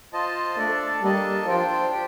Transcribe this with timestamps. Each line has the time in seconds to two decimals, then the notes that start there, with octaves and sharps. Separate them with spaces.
0.13 F4 C5 D#5 A5
0.57 A3 D4 A4 D5
1.01 G3 A#3 D4 A4 D#5 A5
1.46 F3 D4 F4 C5 G5
1.90 G4 C5 G5